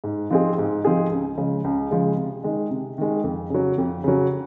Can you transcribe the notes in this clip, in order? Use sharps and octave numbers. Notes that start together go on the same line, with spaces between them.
G#2
F3 C4 D#4 G#4
G#2
F3 C4 D#4 G#4
C#2
C#3 F3 G#3
C#2
C#3 F3 G#3
C3
D#3 G#3
C3
D#3 G#3
F2
C#3 F#3
F2
C#3 F#3